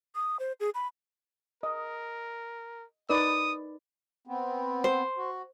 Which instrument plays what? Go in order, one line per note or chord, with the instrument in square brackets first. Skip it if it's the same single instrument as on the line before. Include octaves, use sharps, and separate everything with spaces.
[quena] D#6
C5
G#4
B5
[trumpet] A#4 [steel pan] D#5
[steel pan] D#4 B4 D5 [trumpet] D#6
[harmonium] B3 C4
[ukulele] C5
[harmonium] F#4